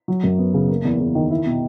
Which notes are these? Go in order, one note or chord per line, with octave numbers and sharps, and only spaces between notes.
F#3
F#2
B3
C#3
A#3
E2
E2
D#3
E4
B2